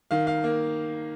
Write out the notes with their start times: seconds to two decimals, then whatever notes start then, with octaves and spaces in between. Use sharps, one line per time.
0.11 D#3 F5
0.27 F5
0.44 A#3